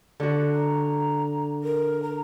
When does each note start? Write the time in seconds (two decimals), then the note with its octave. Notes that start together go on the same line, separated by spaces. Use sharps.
0.20 D3 F#4
0.53 A#5
1.64 A#4
2.03 A#5